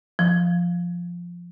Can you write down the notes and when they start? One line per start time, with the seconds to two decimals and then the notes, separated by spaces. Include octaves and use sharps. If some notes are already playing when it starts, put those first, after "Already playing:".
0.19 F3